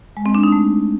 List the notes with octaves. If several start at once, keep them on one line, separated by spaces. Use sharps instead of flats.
G#3
C4
D4
D#4
A3